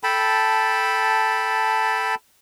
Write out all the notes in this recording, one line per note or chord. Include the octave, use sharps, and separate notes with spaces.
A4 G5 A5 B5